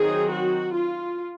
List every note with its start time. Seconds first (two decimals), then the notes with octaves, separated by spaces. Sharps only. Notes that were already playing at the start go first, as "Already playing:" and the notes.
Already playing: D#3 F#3 C4 D#4 G#4
0.30 F#4
0.75 F4